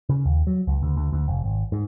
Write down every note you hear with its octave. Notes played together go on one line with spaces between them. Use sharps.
C#3
D#2
F#3
C#2
D2
D2
D2
F1
G#1
G#2